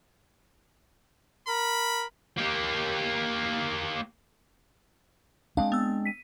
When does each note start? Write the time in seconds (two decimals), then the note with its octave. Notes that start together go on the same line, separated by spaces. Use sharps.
1.48 A#4 B5
2.38 A#3 G4
5.57 G#3 C4 D4 F5
5.72 B3 E6
6.05 B6 D#7